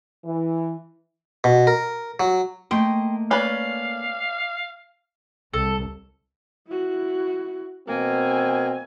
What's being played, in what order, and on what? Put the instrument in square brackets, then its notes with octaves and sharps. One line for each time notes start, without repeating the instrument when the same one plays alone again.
[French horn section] E3
[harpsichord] B2
A#4
F#3
[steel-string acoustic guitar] A3 A#3 D#5 [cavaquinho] G5 C6
[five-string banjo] C#4 B4 [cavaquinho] D5 [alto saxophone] F5
[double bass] C2 [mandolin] A4
[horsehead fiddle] E4 F#4
[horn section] B2 A#3 [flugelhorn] C4 [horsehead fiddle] G#5